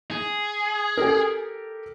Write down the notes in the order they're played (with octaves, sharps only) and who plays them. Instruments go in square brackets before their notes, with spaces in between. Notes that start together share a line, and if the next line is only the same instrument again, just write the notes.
[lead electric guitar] G#4
[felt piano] G4 A4 A#4